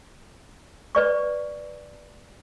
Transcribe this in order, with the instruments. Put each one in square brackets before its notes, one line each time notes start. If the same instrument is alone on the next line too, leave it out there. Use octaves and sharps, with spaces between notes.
[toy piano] B4 D5 C#6